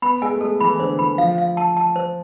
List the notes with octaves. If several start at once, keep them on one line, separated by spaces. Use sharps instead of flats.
B3 B5
G#3 G#5
A3
G#3 A4
E3 B5
D3 C5
E3 B5
F3 F5
F5
A5
A5
C5